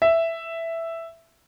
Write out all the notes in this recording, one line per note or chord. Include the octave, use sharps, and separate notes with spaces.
E5